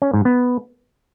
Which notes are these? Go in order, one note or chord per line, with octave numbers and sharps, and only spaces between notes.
C#4
G#2
B3